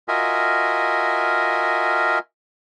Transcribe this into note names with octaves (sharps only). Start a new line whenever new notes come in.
F4 F#4 A#4 D#5 E5 G#5